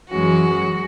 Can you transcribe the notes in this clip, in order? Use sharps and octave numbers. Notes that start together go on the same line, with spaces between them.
F#2 E3 G#3 C#4 F#4